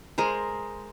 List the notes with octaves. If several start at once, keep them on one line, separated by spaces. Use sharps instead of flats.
G#3 A#4 C5